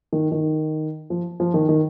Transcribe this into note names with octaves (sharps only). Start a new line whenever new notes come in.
D#3
D#3
F3
F3
D#3
D#3